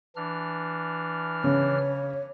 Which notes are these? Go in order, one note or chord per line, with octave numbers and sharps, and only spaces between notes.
E3 D4 F6
C#3 C#5